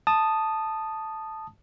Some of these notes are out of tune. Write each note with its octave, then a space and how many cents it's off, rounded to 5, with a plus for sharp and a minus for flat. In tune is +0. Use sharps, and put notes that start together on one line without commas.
A5 +0 D#6 -10